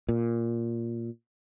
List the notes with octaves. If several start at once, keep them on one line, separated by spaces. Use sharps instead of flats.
A#2